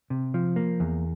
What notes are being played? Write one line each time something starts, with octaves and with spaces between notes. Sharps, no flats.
C3
F3
A#3
E2